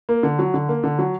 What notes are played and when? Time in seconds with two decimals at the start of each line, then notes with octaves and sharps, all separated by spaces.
0.09 A#3
0.23 D3
0.39 F#3
0.54 D3
0.69 A#3
0.84 D3
0.99 F#3